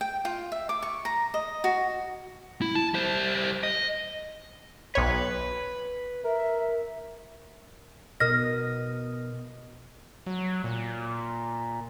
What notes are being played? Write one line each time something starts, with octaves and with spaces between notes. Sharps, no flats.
G5
F4
E5
D6
C#6
A#5
D#5
F#4
E4
A5
G3 C5
D#5
B1 B4 C#5
A#4 E5
B2 A#4 D#5 F6 A#6
F#3
A#2